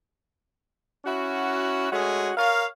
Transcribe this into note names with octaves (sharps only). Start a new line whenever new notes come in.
C#4 E4 F#4
G#3 A3 C#4 F#4 G#4
A#4 C#5 F5